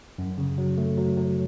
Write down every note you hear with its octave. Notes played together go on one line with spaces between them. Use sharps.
F#2
C#3
F#3
A3
F#3
F#3